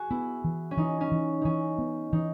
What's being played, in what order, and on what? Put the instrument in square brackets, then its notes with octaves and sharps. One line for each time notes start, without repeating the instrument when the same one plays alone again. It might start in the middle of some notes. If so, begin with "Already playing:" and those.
Already playing: [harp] F#4 G#4
[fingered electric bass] B3 [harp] E4
[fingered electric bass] E3
[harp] C#4
[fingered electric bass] E3 [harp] D#4
[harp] C#4
[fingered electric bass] E3
[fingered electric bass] E3 [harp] C#4 D#4
[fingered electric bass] B3
[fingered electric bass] E3 [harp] D#4